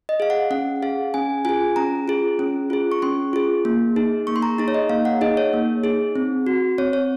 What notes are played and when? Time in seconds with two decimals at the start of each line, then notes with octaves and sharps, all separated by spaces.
0.09 D#5
0.20 G#4 F5
0.30 F#5
0.51 C#4 F#5
0.82 G#4 F5
1.14 C#4 G#5
1.45 F4 G#4 G#5
1.76 C#4 A#5
2.08 F4 G#4
2.39 C#4
2.70 F4 G#4
2.92 C#6
3.02 C#4 C6
3.33 F4 G#4
3.65 A#3
3.96 D#4 G#4
4.27 A#3 C#6
4.36 C6
4.42 A#5
4.58 D#4 G#4 A#5
4.68 C#5
4.74 D#5
4.90 A#3 F5
5.05 F#5
5.21 D#4 G#4 D#5
5.37 C#5
5.53 A#3
5.84 D#4 G#4
6.16 C4
6.47 F#4
6.78 C4 C#5
6.93 C#5